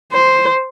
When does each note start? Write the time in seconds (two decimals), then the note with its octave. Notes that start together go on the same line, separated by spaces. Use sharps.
0.12 C5